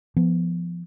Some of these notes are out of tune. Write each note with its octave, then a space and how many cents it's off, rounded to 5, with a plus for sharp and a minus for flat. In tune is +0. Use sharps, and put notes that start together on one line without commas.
F3 -15 B3 +0